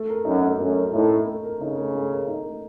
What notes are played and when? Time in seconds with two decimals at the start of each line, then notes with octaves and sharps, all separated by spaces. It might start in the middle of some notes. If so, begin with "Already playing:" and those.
Already playing: A3
0.09 A#4
0.25 F#2 D#4
0.43 A3
0.59 F#2 A3
0.77 A#4
0.93 A2 D#4
1.11 A3
1.27 A3
1.44 A#4
1.61 C#3 D#4
1.78 A3
1.95 A3
2.11 A#4
2.28 D#4
2.45 A3